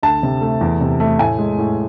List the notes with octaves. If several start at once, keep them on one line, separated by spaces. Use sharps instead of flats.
D2 A5
C3
A3
E2
C3
A3
A2 G#5
G#3
A2